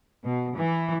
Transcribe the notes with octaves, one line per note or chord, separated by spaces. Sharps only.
B2
E3